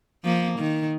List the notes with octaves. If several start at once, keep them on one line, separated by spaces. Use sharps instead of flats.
F3 A#3
D#3